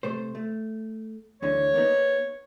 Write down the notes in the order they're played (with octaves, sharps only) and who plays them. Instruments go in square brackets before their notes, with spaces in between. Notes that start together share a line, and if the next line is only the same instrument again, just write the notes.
[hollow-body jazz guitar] C3 A3 C5
A3
[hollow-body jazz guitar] D2 D3 E3 [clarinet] C#5
[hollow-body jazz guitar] A#3 B3 D#4